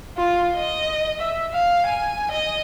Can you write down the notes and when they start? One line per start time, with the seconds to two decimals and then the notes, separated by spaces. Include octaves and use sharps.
0.17 F4
0.56 D#5
1.20 E5
1.53 F5
1.86 G#5
2.31 D#5